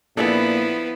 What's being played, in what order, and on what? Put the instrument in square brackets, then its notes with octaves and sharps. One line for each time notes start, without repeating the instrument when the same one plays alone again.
[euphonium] A#2 [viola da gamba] F3 E4 [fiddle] B3 [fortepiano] D4 G#4 A4